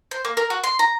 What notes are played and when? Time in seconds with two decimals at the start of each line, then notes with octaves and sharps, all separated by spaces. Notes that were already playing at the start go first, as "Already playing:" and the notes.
0.11 C5
0.25 A#3
0.37 A#4
0.50 F#4
0.64 C6
0.79 A#5